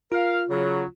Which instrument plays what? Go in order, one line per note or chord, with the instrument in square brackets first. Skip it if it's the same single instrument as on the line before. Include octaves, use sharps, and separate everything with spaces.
[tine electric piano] F4 [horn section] A#4 F5
[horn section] C#3 F#3